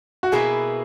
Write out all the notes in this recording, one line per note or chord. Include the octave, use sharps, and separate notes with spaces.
F#4
B2 A#3 E4 G#4 B4